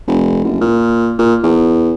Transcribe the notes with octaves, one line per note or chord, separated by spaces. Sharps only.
F1
F#1
A#2
A#2
E2